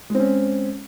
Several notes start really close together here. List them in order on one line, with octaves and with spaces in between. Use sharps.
G#3 C4 C#4